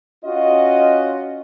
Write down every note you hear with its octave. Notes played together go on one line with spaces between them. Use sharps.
C#4 F4 F#4 D#5